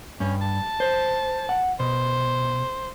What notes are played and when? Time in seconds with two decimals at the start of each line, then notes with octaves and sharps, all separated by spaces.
0.20 G2 C#4
0.41 A5
0.80 C5
1.49 F#5
1.80 B2 C5